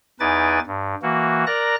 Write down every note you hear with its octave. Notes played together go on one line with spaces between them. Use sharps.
E2 D#4 B4 G#5 D6 A6
G2
E3 A#3 F#4
A#4 D5 A#5 F#6 A#6